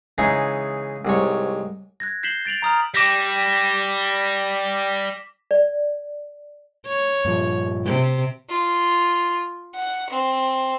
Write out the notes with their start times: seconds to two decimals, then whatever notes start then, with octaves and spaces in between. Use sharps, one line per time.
0.18 C#3 E3 G#3 D#4 G#4
1.05 C2 G#2 C#5
2.00 F#6 G#6 A#6
2.23 G6 B6 C7 E7 F#7 G7
2.45 A6 D7 F7 F#7
2.62 A#5 D#6 F6
2.94 G3 D6 A#6 B6
5.51 D5
6.87 C#5
7.25 G2 A#2 F3
7.85 C3
8.50 F4
9.75 F#5
10.10 C4